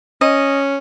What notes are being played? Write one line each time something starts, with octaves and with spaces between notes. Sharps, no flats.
C#4 D#5